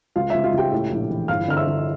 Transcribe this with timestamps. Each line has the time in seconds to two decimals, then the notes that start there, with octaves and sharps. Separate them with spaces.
0.16 C#2 F4 F5
0.30 C#2 E5
0.44 F4 F5
0.54 C#2 G4 G5
0.72 A2
0.91 A#1
1.10 E3
1.28 G1 F5 F6
1.48 D3 F6
1.57 E5 E6
1.67 D3